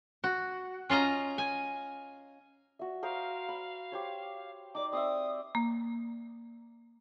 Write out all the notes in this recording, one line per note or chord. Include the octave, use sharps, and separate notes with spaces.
F#4
C#4 F4 D#5 A#5
G#5
F#4 E5
A#4 C5 F5 D#6
B5
G4 C5 C#5
D#4 D5 D6
C4 C5 E5 D#6
A#3